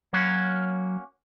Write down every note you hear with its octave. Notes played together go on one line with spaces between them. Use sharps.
F#3 A#3 C#4 F#4